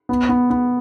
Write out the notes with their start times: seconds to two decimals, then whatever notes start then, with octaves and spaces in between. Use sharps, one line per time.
0.09 B3
0.29 B3
0.50 B3